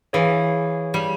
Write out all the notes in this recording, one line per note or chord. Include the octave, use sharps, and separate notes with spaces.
E3 G#4 C#5 F5
G3